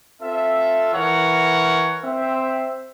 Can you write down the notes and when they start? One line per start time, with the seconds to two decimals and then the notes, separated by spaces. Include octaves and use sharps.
0.22 C4 F4 A4 E5
0.95 E3 A#4 C#5 F#5
2.04 C4 C5 E5